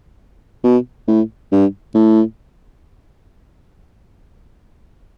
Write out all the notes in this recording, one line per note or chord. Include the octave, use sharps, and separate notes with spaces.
B2
A2
G2
A2